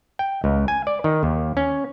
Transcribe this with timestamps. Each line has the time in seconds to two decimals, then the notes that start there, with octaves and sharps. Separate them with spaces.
0.19 G5
0.44 C#2
0.68 G#5
0.87 D5
1.04 D#3
1.23 D#2
1.57 C#4